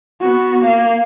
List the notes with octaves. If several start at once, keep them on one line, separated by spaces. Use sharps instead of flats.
B3 F#4
A#3 F5